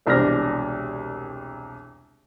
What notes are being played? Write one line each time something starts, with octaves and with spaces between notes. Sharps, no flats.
E1 C2 D4 C5 F6 A#6